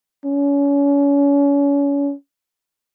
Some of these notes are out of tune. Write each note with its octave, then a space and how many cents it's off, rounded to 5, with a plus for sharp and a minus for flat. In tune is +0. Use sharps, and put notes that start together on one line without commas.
C#4 +35